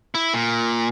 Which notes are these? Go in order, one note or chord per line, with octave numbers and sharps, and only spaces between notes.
E4
A#2